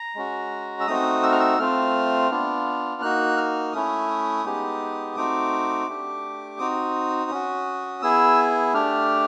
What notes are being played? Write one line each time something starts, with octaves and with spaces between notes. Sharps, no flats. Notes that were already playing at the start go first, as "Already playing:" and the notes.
Already playing: A#5
G#3 C#4 F#4
E6
A3 C4 D#4 F#4 D#6
E6
F6
E6
A3 C4 F4 F6
B3 D4 F4
A#3 D#4 F#4 F#6
F6
A3 C#4 E4 D#6
G#3 B3 D#4 G4
A3 C4 D#4 F#4 D6
A3 D4 G4
C4 D#4 F#4 D#6
C#4 F#4
B3 E4 G#4 E6
A3 D4 G4 F6